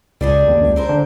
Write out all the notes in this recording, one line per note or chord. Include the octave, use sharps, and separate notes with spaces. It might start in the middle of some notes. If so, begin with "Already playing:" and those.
C#2 G3 D4 G#4
D#2
C#2
C4 A#4 C5
D3